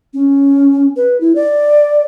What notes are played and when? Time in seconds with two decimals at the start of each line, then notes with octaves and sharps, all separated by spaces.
0.14 C#4
0.97 B4
1.21 E4
1.36 D5